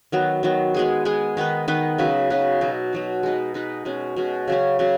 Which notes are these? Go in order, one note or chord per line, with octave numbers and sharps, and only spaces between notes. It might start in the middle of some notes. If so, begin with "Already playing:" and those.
D#3 F#3 B3
D#3 F#3 B3
G#3 B3 G#4
G#3 B3 G#4
D#3 B3 D#4 B4
D#3 B3 D#4 B4
C#3 F#3 D#4 B4
C#3 F#3 D#4 B4
B2 F#3 D#4
B2 F#3 D#4
G#3 D#4 B4
G#3 D#4 B4
B2 G#3 C#4
B2 G#3 C#4
C#3 F#3 C#4
C#3 F#3 C#4